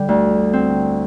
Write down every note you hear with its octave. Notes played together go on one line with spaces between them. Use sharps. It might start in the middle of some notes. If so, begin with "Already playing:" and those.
Already playing: D3 G3
D2
C4